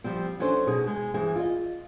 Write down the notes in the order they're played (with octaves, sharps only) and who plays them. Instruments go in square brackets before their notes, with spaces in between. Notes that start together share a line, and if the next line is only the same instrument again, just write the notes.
[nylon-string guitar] F3 G3 C4
F#3 C#4 D4 A4 C5
B2 D#4 G#4
G#3
G2 E3 C4 G#4
F4 D#5